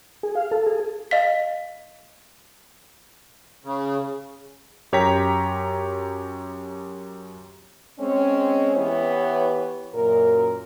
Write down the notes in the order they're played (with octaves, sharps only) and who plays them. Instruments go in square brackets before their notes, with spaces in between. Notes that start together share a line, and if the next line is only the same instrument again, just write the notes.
[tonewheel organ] G#4
F5
A4
G#4
[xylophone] D#5 F5 B6
[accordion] C#3
[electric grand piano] F#2 G4 C#5 G5 A#5 B6
[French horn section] G#3 C4 C#4
E3 B3 E4 G4 B4 C#5
F#2 A#2 A#4